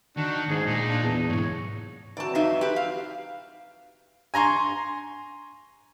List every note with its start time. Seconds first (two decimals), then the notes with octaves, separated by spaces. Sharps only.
0.17 D#3 D4 F#4
0.49 C#2 G#2 G#4
0.67 A#2 D#4
0.89 D4
1.02 E2
1.29 B1 G#2 C#5
2.17 E3 F#3 C4 D5 A5
2.35 F2 D#4 E5
2.61 G4 B4
2.76 F5
4.34 G#5 A#5 C6 C#6